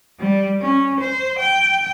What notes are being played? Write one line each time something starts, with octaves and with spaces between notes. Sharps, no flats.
G3
C#4
C5
G5